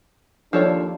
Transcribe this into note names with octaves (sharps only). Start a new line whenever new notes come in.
D#2 F3 D4 A4 C#5